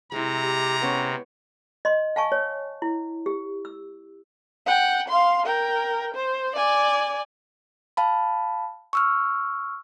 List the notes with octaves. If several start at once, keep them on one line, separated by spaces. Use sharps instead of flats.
C3 G#3 E4 A#5
G4
B3 C#4 C#5
D#5 C6
F5 G#5 A5 C#6
C#5
E4
G4
E6
F#5 G5
F5 C6
A#4 G5
C5
D5 G#5
F5 A5 B5
C#6 E6 F6